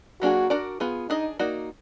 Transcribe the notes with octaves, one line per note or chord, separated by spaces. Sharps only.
F#3 A#3 D4 F#4 G#4
D4 F#4 A#4 D5
B3 F4 G#4
D4 D#4 G#4 D#5
A#3 D#4 F#4 D5